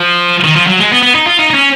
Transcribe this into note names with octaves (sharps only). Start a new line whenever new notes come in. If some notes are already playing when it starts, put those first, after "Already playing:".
Already playing: F3
D#3
F3
F#3
G#3
B3
B3
D#4
F4
D#4
D#4
C#4